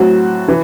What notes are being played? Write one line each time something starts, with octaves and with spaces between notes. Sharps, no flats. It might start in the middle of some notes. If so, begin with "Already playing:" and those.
Already playing: A2 F#3 C4 F#4
E3